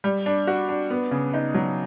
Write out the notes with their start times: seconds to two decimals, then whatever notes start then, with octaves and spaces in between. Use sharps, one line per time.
0.04 G3
0.26 D4
0.47 F#4
0.69 D4
0.90 B3
1.11 C#3
1.34 D#4
1.54 F#3